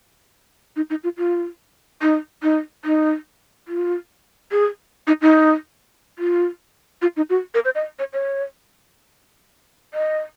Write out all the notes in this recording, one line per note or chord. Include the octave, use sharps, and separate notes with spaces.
D#4
D#4
F4
F4
D#4
D#4
D#4
F4
G#4
D#4
D#4
F4
F4
D#4
F#4
A#4
C5
D#5
C#5
C#5
D#5